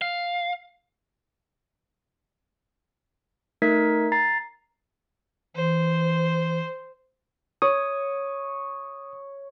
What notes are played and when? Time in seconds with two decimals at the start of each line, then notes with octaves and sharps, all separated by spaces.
0.02 F5
3.62 A3 D#4 A#4 G#6 B6
4.12 A#5 A6 C7
5.55 E3 C5
7.62 C#5 D#6